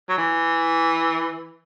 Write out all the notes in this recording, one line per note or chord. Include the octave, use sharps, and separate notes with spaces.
F#3
E3